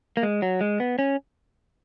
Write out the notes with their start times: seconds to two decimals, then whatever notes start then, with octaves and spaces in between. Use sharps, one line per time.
0.17 A#3
0.23 G#3
0.42 F#3
0.61 G#3
0.80 B3
0.99 C#4